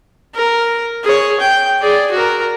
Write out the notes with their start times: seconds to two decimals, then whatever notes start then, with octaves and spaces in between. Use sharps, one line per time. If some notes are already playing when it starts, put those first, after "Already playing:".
0.34 A#4
1.04 G#4 C#5
1.40 G5
1.81 G#4 D5
2.11 F#4 A#4